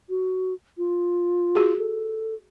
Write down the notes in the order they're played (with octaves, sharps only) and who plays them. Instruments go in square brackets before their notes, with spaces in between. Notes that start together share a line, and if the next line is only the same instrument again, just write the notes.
[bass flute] F#4
F4
[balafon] F#4 G#4
[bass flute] A4